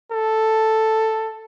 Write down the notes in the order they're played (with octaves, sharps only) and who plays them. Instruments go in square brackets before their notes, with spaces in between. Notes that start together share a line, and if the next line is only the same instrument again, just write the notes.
[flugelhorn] A4